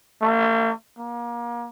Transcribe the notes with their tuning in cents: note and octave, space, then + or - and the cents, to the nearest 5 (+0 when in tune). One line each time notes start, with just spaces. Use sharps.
A#3 -45
A#3 +35